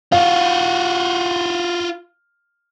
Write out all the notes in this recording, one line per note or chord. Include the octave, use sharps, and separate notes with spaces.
F4 F#4 F5